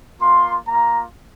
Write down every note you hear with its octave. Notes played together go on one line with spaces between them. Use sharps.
A#3 F4 C6
A#3 F4 A#5